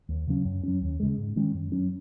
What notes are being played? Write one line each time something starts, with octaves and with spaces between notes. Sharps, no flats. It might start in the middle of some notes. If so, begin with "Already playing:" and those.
D#2
C#3 F#3 C#4
F#2
F#3 C#4
D#2
C#3 G#3
G#2
D#3 G#3 C#4
F#2
F#3 C#4